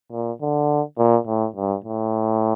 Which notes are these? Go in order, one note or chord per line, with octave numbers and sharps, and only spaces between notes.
A#2
D3
A#2
A2
G2
A2